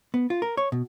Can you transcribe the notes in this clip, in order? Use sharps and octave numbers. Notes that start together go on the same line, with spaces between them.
B3
F4
A#4
C#5
B2